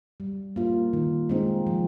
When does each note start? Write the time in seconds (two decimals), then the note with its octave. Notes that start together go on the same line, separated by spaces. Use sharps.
0.20 G3
0.56 A#3 F4
0.93 D#3
1.29 G#3 C4 D#4
1.67 F3